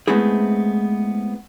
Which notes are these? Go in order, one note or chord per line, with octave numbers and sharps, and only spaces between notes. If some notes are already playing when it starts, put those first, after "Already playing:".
G#3 A3 B3 C4 E4 G#4